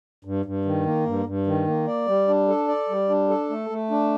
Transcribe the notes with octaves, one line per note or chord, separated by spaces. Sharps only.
G2
G2
D#3
A#3
G2
G2
D#3
A#3
D5
G3
D4
A4
D5
G3
D4
A4
A3
A3
D4